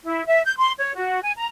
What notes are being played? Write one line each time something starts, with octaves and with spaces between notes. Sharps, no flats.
E4
E5
G6
C6
C#5
F#4
G#5
A#5